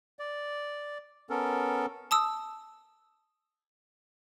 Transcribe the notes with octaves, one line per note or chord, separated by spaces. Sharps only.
D5
B3 C#4 A4 A#4
A5 D#6 E6